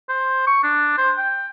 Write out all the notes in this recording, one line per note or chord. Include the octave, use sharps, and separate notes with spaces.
C5
C#6
D4
C5
G5